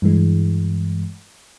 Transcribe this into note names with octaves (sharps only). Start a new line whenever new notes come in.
G2 E3 G#3